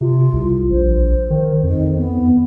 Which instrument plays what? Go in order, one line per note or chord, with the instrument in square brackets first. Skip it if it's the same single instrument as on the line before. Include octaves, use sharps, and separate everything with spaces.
[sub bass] C3 [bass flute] F4
[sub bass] C2
[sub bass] A#1 [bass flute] C5
[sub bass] D#3
[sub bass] F2 [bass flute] D#3
[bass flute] B3